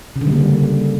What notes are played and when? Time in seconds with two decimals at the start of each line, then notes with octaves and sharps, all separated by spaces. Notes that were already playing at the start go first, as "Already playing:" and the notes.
0.16 C#3
0.21 D3
0.27 G3
0.33 A#3
0.38 D3